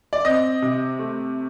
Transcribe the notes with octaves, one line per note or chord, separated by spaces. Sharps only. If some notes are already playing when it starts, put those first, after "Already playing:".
D5
C4 D#5
C3
A3